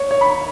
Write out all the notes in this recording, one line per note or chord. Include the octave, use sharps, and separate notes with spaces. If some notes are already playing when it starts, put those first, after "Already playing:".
Already playing: C#5
C#5
B5